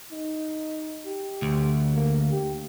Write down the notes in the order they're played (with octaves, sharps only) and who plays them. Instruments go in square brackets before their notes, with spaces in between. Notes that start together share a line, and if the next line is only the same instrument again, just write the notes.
[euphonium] D#4
G4
[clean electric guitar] D2
[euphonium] A#3
G4